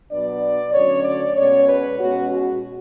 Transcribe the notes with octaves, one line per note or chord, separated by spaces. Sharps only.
B2 F#3 B3 D4 D5
D2 D3 F#3 C#4 C#5
D5
B2 G#3 C#4 C#5
B4
B2 G#3 C#4 F#4
F#4